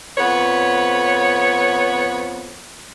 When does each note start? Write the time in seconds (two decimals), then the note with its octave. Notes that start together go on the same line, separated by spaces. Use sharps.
0.18 F2 B3 B4 C#5